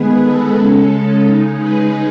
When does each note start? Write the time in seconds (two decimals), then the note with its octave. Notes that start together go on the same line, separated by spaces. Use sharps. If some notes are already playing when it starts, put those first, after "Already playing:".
Already playing: D#3 G#3 B3 G#4 B4
0.22 A4
0.56 C#3 G#3 C#4 A4
1.25 C#3 G#3 D#4
1.59 G#4 B4